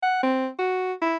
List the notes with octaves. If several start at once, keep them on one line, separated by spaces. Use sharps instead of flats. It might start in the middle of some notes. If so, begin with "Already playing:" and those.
F#5
C4
F#4
E4